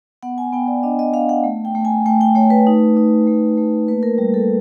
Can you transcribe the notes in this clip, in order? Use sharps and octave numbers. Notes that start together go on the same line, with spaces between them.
B3 F#5
G#5
B3 G5
D5
D4 D#5
D#5
D4 F5
F#5
A3
G5
A3
G#5
A3 G5
G5
A3 C#5
B4
D#4
D#4
A3
A3
A#3 B4
A#4
G3
A4